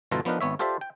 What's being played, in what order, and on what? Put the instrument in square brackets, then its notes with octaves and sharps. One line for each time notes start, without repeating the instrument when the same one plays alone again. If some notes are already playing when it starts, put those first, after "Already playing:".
[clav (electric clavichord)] G1 B2 E3 F4 A4 A#5
F3 B3 D4 D#4 A#4 B4
G#1 B3 C#5 E5
F4 G4 A4 C5 D5 E5
G5